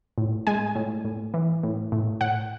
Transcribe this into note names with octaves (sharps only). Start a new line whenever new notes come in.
A2
G#3 G#5
A2
A2
E3
A2
A2
A2 F#5